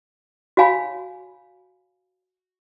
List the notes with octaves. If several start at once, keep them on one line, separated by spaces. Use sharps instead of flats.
F#4 C#5 F5 G#5 B5